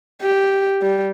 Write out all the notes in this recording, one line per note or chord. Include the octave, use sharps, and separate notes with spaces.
G4
G3